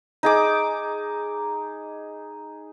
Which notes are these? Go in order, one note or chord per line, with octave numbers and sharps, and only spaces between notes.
D#4 G#4 D6